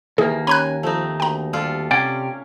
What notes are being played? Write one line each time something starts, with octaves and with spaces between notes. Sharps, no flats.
D#2 E3 A#3 G#4
C#4 G#5 A#5 B5 F#6
F3 A3 C4 D#4
D2 G5 A#5
G3 F4 A4
C3 C#4 D5 F#5 G5